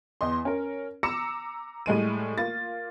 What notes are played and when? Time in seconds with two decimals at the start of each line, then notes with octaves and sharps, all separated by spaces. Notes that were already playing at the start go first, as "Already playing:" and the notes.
0.21 E2 D#5 C6
0.45 C#4 A#4
1.03 A#5 D6 E6 A#6 C#7 E7
1.86 A2 G3 G#3 D#7
2.38 A#3 F4 A6